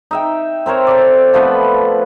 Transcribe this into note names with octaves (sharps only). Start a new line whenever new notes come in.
D#4 E5 G5
C4 A#4 C5 C#5
A4 D5
F3 A3 B3 B4